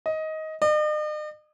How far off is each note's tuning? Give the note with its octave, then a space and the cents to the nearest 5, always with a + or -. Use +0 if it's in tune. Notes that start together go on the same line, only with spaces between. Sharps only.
D#5 +15
D#5 -45